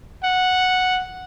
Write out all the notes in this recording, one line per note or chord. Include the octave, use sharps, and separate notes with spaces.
F#5